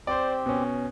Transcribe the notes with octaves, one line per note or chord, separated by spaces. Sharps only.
C4 G4 C5 D5
B2 C#4